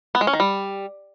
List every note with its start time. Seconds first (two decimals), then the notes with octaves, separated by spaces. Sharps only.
0.15 B3
0.21 G#3
0.27 C#4
0.33 D#3
0.40 G3